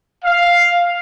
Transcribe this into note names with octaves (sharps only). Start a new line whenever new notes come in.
F5